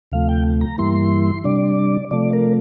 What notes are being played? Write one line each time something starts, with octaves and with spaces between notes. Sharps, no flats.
D2 C3 F3 A3 F5
G5
A#5
G2 E3 G3 A#3 E4 C6
C3 G3 D4 D5
C3 F3 A3 D5
A#4